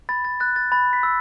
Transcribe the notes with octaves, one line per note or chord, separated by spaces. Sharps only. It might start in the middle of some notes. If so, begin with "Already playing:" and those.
B5 A6
A6
F#6 A6
A6
B5 A6
B6
E6